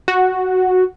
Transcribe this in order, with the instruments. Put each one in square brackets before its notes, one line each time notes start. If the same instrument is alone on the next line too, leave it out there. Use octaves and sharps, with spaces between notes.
[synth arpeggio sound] F#4